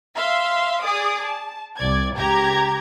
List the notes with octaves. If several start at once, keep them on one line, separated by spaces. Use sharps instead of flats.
E5 F5 C6
G#4 D5 D#6
A5
C2 D5 G#6
C#2 G4 A#5 G#6